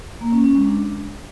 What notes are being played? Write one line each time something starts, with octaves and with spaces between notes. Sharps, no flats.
A#3
C#4
C#4
G#3
D4